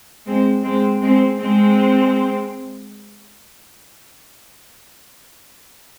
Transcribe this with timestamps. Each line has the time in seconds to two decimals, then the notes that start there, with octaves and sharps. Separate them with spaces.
0.26 G#3 C4
0.63 G#3 C4
1.01 G#3 C4
1.38 G#3 C4